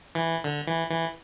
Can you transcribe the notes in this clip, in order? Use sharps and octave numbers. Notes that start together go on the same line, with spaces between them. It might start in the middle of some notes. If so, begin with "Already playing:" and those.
E3
D3
E3
E3